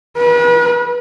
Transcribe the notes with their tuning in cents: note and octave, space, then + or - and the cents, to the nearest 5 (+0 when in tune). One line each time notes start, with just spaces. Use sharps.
B4 -40